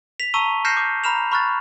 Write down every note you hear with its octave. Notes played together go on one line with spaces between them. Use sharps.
B6 F7
A5 A#5 C#6 E6 D#7 G7
F6 G6 A#6 C7 C#7 E7
D6
A#5 B5 F6 E7 F7
B5 C#6 F6 F#6 A6